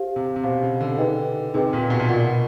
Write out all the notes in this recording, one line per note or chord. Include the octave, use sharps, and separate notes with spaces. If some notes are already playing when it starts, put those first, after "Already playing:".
Already playing: G4 C5 F5
C3
C3
B2 G4 C5 F5
C#3
D3
D#4 G#4 B4 D#5 G5
C3 D#4 G#4 B4 D#5 G5
A#2
B2
A#2
B2 F4 A#4 D5 F#5